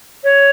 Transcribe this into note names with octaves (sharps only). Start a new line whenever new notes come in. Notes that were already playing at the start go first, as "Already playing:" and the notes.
C#5